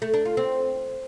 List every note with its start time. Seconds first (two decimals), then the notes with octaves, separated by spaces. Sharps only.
0.02 A3
0.14 D4
0.25 F4
0.37 C4